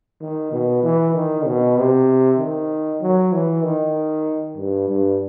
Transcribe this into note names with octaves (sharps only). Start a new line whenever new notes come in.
D#3
B2
E3
D#3
B2
C3
D#3
F#3
E3
D#3
G2
G2